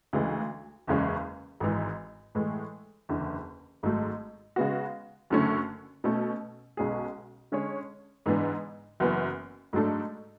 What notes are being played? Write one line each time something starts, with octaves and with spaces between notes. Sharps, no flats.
D2 C#3 E3 G#3
F#1 E2 C#3 G#3 C#4
G#1 G#2 E3
A2 E3 G#3
F#1 E2 D3
G#1 G#2 F#3 A3
C#3 G#3 B3 F#4
F#1 F#2 D3 A3 C#4
B2 A3 C#4
B1 B2 G#3 C#4 G#4
D3 G#3 C#4 G#4 C#5
G#2 E3 B3 D4
F#1 F#2 E3 B3
G#2 F#3 A3 D4 A4